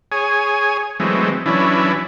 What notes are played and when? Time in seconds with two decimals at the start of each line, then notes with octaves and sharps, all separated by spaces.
0.12 G#4 C#5 G#5
1.00 E3 F#3 G#3 A3 C4
1.46 E3 F#3 C#4 D4 E4